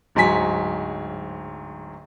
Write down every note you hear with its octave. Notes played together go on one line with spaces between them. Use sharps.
D1 G#2 F#3 G#5 B6